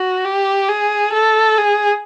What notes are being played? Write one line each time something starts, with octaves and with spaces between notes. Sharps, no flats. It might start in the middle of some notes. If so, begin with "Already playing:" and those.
Already playing: F#4
G4
G#4
A4
G#4